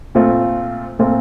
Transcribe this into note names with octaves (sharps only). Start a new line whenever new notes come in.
A#2 A3 C4 F4
A#2 A3 C4 F4